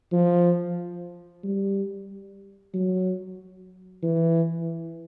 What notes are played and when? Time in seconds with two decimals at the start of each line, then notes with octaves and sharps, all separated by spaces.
0.12 F3
1.44 G3
2.74 F#3
4.03 E3